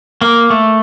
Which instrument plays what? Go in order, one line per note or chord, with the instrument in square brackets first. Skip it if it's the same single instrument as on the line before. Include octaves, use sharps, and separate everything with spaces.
[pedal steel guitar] A#3
A3